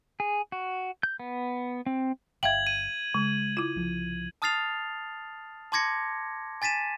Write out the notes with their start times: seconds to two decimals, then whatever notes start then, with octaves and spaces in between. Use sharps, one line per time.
0.20 G#4
0.52 F#4
1.03 G6
1.20 B3
1.86 C4
2.43 G1 E5 F5 G5 G#6 F#7
2.67 D#7
3.15 C#3 G#3
3.57 E4 F4
3.76 C2 F3
4.42 A5 D#6 F6 A6 C7 F7
5.72 A5 C6 D6 G#6 A#6 C#7
6.62 G#5 A6 B6 D#7 E7